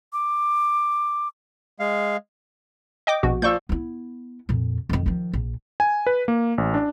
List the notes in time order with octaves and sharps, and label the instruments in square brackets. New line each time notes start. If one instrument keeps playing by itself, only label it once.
[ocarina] D6
[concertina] G#3 F5
[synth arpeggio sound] D#5 G5 D6
A#1 B2 F#4
[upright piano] F3 D5 E6 [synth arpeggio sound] C#6 G6
[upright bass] B3 E4
F2 A#2
F2 D#3
D#3 F3
A#1
[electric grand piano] G#5
B4
A#3
A1
D4